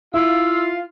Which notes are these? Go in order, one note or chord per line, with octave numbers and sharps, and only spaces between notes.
E4 F4 F5 E6